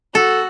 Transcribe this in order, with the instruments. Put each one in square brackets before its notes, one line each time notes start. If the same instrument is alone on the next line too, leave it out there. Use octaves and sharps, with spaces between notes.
[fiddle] F#4 [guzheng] A4